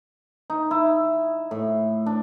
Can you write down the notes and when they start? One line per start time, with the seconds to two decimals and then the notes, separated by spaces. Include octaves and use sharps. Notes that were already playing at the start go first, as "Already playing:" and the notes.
0.50 D#4
0.71 E4
1.51 A2
2.06 D4